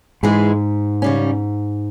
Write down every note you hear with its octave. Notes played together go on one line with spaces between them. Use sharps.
G#2 E3 G#3 E4 G#4
C#3 G3 C#4